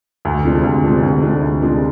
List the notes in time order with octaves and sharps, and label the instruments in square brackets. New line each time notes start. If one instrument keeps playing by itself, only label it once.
[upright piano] D2
C3 F3 G#3 D4
D2
C3 F3 G#3 D4
D2
C3 F3 G#3 D4
D2
C3 F3 G#3 D4